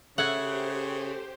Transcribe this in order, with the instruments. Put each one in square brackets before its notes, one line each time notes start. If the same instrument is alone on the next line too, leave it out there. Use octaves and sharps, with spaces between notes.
[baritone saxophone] C#3 [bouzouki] A3 E5 G#5 [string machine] G4 C5 [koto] F#5